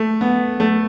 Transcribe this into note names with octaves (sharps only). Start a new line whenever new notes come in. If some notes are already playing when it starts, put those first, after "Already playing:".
Already playing: A3
B3
A3